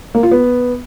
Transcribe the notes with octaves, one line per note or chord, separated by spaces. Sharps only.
A#3
F4
B3